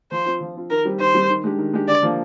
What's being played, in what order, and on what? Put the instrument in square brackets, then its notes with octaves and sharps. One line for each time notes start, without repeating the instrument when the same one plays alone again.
[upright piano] F3 [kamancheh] C5
[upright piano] C4 F4
F3
C4 F4
[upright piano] D#3 [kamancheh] A#4
[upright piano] G3 C4 G4
[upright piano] D#3 [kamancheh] C5
[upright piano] G3 C4 G4
D#3
G#3 D4 G4
D#3
G#3 D4 G4
[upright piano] D3 [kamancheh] D5
[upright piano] F3 A#3 D4